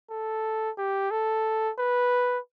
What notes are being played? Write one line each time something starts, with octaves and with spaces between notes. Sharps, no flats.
A4
G4
A4
B4